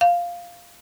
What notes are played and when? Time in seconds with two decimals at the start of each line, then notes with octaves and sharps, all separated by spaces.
0.01 F5